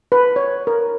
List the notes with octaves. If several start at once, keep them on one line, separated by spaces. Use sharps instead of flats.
B4
C#5
A#4